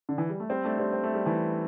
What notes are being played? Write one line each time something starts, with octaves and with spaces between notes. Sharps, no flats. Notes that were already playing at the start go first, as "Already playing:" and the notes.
D3
E3
G3
A3
G3 C4
A3 D4
G3 C4
C4
A3
G3
E3 A3